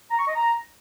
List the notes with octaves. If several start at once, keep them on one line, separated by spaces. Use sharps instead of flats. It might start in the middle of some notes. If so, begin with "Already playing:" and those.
A#5
C#6
D#5
A#5